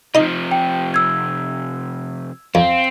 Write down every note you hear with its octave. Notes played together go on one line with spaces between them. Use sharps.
C3 F3 D#4 D#5
G5
E6 G#6
F2 C4 F5